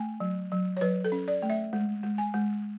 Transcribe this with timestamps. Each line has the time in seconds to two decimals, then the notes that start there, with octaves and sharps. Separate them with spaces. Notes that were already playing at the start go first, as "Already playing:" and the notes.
Already playing: A3 G#5
0.20 F#3
0.52 F#3
0.77 C#5
0.81 F#3 B4
1.05 A4
1.12 C#4
1.28 D5
1.42 A3
1.50 E5
1.73 G#3
2.03 G#3
2.18 G#5
2.34 G#3